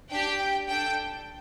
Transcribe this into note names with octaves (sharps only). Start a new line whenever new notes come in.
D4 G4 G5
D4 A4 G5